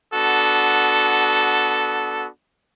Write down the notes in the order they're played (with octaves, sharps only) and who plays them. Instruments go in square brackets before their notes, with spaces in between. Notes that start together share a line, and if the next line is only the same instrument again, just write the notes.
[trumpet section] B3 D4 F#4 A4